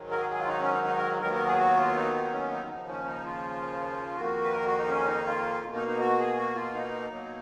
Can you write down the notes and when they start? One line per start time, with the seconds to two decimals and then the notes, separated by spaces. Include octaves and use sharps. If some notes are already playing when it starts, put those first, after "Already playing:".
Already playing: G#2 D#3 F#3
0.11 A#4
0.20 G#4
0.30 G#4
0.39 F4
0.48 D#4
0.60 C#4
0.73 D#4
0.85 D#4
0.97 A#4
1.21 D#2 D#3 F#3 B3 A#4
1.34 A#4
1.46 G#4
1.58 F#4
1.77 F4
1.96 D#4
2.13 D#4
2.32 C#4
2.51 D#4
2.68 D#2 C#3 F3 D#4
2.88 C#4
3.05 D#4
3.25 F4
4.16 F2 D#3 A#3 F#4
4.43 B4
4.52 A#4
4.66 F#4
4.78 D#4
4.89 C#4
5.08 D#4
5.27 F4
5.63 B2 A#3
5.76 D#4
5.88 D#4
6.00 F#4
6.19 G#4
6.37 F#4
6.55 F4
6.74 D#4
7.11 B2 F#3 A#3